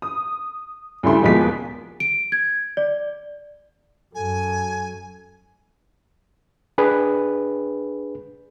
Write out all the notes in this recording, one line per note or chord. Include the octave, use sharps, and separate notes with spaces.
D#6
D2 C#3 G3 E4 A4 C6
D#2 A#2 F3 G#3 B3 B6
D7
G#6
D5
F#2 A4 G#5
D4 G#4 B4